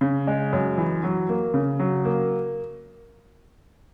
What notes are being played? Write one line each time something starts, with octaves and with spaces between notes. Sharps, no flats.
C#3
G#3
F#2
E3
F#3
A#3
C#3
F#3
A#3